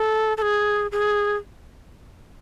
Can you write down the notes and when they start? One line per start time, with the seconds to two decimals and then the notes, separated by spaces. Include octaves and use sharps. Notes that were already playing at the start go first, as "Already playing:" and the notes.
Already playing: A4
0.37 A4
0.42 G#4
0.92 G#4